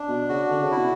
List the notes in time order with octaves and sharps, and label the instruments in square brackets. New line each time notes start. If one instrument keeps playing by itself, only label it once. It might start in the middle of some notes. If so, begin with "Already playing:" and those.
Already playing: [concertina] D4
[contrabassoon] B2
[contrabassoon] C#3 [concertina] F#4
[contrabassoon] D3
C#3
[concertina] E4
[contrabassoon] B2